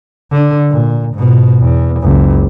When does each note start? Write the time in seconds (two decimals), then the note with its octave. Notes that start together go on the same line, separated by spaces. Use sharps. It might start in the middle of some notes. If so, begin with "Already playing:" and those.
0.32 D3
0.71 A#2
1.14 G#2 B2
1.61 E2
2.02 F#1 C#2